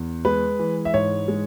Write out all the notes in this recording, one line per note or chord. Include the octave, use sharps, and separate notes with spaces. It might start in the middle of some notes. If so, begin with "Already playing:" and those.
Already playing: E2
G#3 B4
E3
E5
G#2 C#5
G#3